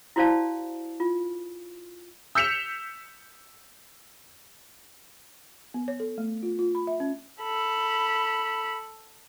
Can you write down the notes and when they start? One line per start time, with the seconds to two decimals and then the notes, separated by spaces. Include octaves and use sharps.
0.16 E4 F#4 C5 D5 F5 A5
1.00 F4
2.35 E6 G6 B6 C#7 E7 F7
5.74 B3
5.88 C#5
6.00 A4
6.18 A3
6.43 F4
6.59 F4
6.75 B5
6.87 E5
7.00 C#4
7.43 A4 B5